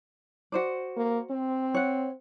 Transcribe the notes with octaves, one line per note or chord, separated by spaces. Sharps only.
F#4 C5 D5
A#3
C4
C#5 F#5